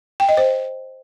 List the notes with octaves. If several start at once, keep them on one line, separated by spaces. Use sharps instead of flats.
G5
D#5
C5